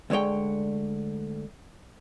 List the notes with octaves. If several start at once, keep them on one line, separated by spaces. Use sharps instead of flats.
D2 D3 G#3 C#5 G5